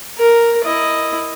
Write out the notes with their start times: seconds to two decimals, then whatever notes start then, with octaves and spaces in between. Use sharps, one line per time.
0.18 A#4
0.64 E4 D#5